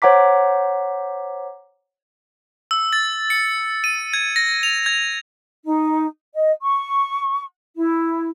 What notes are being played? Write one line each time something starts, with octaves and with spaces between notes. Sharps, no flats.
C5 C#5 F#5 A#5 D6 B6
E6
A6
C#7
D#7
G#6
A#6
F7
G#6
D#4
D#5
C#6
E4